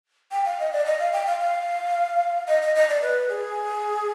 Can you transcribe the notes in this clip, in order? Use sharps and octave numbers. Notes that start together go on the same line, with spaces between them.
G5
F5
D#5
D5
D#5
F5
G5
F5
F5
D#5
D#5
D#5
D5
B4
G#4